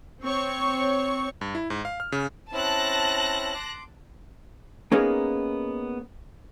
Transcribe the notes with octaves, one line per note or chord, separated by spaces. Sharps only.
C4 C#5 C#6
G2
E4
G#2
F5
F6
C#3
C4 C#4 E4 A5 F#6 A#6
C6 D6
A#3 B3 C#4 D#4 G#4 A#4